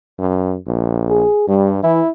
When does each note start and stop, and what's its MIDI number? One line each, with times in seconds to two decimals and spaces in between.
0.19 0.56 42
0.67 1.24 34
1.09 1.47 68
1.48 1.79 43
1.48 1.74 55
1.83 2.02 52
1.83 2.09 64